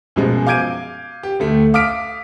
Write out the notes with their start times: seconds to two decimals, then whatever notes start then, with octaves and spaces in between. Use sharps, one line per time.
0.16 F#2 B2 F3 G#3
0.47 F5 D6 G6 G#6 D7 D#7
1.23 G4
1.40 D2 A3
1.74 F5 D6 D#6 F6 B6 D7